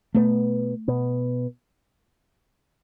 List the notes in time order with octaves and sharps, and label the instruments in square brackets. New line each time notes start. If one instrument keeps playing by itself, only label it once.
[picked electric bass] B2 B3 [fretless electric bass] A3
[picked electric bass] B2 B3